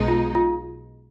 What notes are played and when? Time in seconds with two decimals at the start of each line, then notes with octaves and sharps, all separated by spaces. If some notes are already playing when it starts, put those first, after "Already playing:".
Already playing: B1 B2 G#3 D#4
0.08 F4
0.35 F4